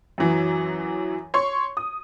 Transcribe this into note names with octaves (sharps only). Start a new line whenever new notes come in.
F#2 E3 F#3
C#5 C6 C#6
D#6